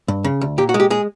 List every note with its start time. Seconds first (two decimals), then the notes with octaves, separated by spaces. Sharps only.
0.08 G2
0.24 C#3
0.41 D2
0.58 A#2 G4
0.69 F#4
0.74 G#3
0.80 G4
0.90 G#3 G#4